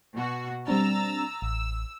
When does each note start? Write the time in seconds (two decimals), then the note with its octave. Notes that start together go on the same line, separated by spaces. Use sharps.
0.15 B2 F#4
0.68 G3 C4 D4 A#5 E6 A6
1.42 A1 E6